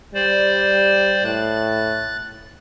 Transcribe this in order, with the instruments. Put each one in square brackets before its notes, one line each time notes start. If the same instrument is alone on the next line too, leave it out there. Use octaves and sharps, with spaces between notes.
[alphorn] G3 [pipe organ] C5 D5
[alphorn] A2 [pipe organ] F#6 A6